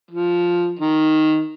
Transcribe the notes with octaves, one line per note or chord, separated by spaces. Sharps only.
F3
D#3